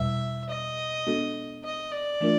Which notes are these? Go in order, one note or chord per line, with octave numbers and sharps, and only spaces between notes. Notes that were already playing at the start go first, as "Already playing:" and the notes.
Already playing: E2 B2 G3 E5
D#5
G#3 B3 D4 F#4 A4
D#5
D5
E3 A3 D4 F4 A#4